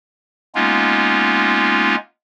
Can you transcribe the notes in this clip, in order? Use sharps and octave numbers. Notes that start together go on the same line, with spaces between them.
G#3 A#3 B3 C#4 D#4 F4